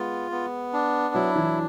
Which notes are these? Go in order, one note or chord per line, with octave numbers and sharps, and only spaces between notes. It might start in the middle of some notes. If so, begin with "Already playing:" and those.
Already playing: G#3 B3 F4
B3
D4
F#3 E4
E3